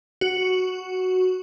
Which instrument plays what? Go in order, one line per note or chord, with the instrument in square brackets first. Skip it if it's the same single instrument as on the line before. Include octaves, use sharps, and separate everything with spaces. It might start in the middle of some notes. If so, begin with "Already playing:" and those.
[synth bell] F#4